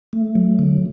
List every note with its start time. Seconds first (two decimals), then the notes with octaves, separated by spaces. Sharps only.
0.13 A3
0.35 F#3
0.59 D3